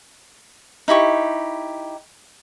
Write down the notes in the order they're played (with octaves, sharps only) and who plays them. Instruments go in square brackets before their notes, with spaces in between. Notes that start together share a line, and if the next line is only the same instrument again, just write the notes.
[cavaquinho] D#4 E4 G4 C#6